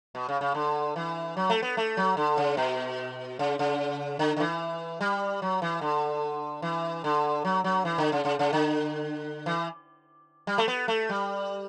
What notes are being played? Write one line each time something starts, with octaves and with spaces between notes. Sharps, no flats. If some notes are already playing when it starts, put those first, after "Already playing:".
B2
C#3
C#3
D3
E3
F#3
A3
B3
A3
F#3
D3
C#3
B2
C#3
C#3
D3
D3
E3
G3
F#3
E3
D3
E3
D3
F#3
F#3
E3
D3
C#3
C#3
C#3
D3
E3
G3
A3
B3
A3
G3